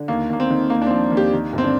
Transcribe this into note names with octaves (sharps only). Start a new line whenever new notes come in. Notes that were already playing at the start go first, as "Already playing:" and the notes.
Already playing: D3
D#2 A#3
D#2 A#3
C4
D#3
D#2 A#3
D4
F3 C4
D#2
G4
D#3
G1 C4
D4